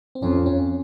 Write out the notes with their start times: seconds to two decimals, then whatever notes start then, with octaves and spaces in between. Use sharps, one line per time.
0.15 C4
0.22 F2 C#4
0.46 C#4